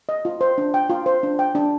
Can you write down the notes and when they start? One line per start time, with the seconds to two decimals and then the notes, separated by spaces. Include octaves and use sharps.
0.09 D#5
0.25 F4
0.41 C5
0.58 D4
0.74 G5
0.90 F4
1.06 C5
1.23 D4
1.39 G5
1.55 D4